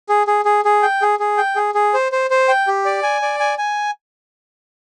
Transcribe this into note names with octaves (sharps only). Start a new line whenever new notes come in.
G#4
G#4
G#4
G#4
G5
G#4
G#4
G5
G#4
G#4
C5
C5
C5
G5
G4
D5
G#5
D5
G#5
G#5